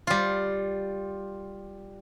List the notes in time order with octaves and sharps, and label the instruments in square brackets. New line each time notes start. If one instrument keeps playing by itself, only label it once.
[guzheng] G3 F4